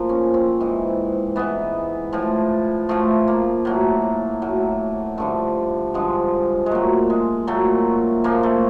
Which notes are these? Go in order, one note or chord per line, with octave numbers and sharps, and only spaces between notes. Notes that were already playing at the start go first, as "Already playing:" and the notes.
Already playing: A#2 F3
C#4
C4
G#2 E3
G#2 E3 B3
A2 F3
A2 F3 A3
A#3
A2 F#3
A2 F#3
G2 D3 F3 A3
G2 D3 F3 G#3
G#3
A#2 F#3 A3
G#3
A#2 F#3 A3
A#2 F3 A#3
A3